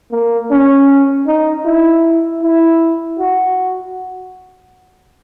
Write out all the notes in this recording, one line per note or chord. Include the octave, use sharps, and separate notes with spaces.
A#3
C#4
D#4
E4
E4
F#4